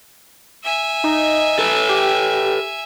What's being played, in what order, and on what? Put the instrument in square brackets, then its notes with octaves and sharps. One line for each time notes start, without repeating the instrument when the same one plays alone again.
[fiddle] E5 G#5
[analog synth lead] D#4
[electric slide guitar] A4 B4
[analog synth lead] G4